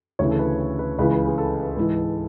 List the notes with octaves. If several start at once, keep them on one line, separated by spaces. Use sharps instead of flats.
D2 C#3 E3 C#5
A4
B4
B4
C#2 C#3 E3 B4
G#4
A4
G#2 E3